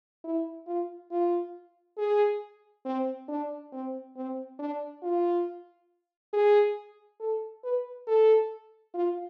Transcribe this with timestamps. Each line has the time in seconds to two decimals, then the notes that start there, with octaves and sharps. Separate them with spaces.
0.24 E4
0.67 F4
1.11 F4
1.98 G#4
2.85 C4
3.28 D4
3.72 C4
4.16 C4
4.59 D4
5.03 F4
6.33 G#4
7.20 A4
7.64 B4
8.07 A4
8.94 F4